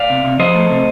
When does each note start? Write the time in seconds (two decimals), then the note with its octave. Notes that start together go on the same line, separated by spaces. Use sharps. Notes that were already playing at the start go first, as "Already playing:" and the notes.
Already playing: D5 F5
0.10 C3
0.24 C3
0.39 F3 C5 D#5
0.55 A3
0.70 C3